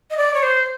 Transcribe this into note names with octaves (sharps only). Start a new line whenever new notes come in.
D#5
D5
C#5
C5